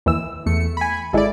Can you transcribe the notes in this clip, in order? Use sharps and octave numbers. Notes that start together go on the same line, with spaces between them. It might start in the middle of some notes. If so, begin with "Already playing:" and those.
D#2 E3 E6
E2 A3 C#7
G#5 B5
G#1 G#3 E4 A4 D5